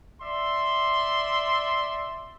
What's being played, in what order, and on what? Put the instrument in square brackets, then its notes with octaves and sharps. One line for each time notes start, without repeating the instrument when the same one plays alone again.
[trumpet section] D5 E5 C6